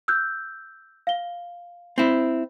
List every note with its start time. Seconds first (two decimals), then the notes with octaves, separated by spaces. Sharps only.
0.08 E6 F#6 G6
1.07 F5 G7
1.98 C4 E4